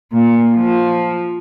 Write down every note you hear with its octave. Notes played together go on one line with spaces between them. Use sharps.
A#2
F3